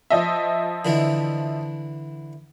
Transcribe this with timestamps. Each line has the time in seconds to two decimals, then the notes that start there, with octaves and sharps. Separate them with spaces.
0.10 F3 D#5 E5
0.85 D3 E3 E4